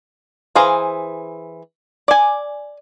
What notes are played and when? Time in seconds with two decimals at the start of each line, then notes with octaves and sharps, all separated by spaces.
0.55 E3 G#4 C5 F5 A#5
2.08 D5 G#5